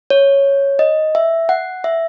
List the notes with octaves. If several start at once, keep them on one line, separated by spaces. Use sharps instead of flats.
C#5
D#5
E5
F#5
E5